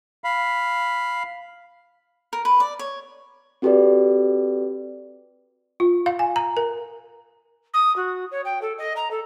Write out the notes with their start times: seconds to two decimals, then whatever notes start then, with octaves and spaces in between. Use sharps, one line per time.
0.24 F5 B5
2.33 A#4
2.45 B4
2.60 D5
2.79 C#5
3.62 C4 F#4 G4 A4 B4 D5
5.80 F4
6.06 F5
6.19 G#5
6.36 A#5
6.57 A#4
7.73 D#6
7.96 F#4
8.31 C#5
8.44 G5
8.61 A4
8.78 D#5
8.96 A#5
9.10 A4